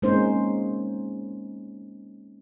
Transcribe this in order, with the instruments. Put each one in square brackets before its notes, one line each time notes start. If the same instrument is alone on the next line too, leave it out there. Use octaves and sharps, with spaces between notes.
[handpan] G#3 A#3 C4 C#4 D#4 C5